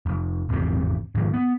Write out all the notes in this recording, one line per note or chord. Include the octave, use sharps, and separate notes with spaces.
F1
G#1 E2 C3
G#2 D#3 F3
B3